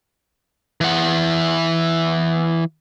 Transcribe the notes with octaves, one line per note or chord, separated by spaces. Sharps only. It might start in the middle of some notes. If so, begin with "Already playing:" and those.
E3 F#5